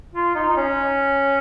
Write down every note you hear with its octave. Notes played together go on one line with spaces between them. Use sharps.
F4
D#4
D#4
C#4